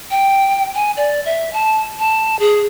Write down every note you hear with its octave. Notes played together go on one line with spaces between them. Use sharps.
G5
G#5
D5
E5
A5
A5
G#4